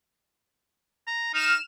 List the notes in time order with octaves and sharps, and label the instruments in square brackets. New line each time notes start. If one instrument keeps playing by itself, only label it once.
[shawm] A#5
[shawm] D#4 [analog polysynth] F6 E7